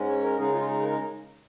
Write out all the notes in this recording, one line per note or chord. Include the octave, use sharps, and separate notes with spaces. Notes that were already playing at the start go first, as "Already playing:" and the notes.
Already playing: G#2 G#3 C#4
C#5
A#4
C#3 G#3 D#4 G#4
F4
G#4
A#4